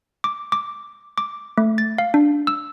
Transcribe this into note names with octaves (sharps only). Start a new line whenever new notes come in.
D6
D6
D6
A3
A6
F5
D4
E6